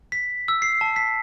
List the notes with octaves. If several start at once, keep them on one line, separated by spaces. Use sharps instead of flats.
B6
E6
C7
A5
B6